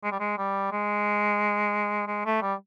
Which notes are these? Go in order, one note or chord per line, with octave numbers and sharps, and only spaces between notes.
G#3
G3
G#3
G3
G#3
G#3
A3
G3